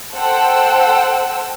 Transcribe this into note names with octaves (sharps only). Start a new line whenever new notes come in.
A4 C5 F#5 G5 E6